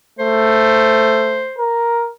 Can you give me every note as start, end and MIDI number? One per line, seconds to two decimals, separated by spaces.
0.19 1.47 57
0.19 1.64 72
1.59 2.10 70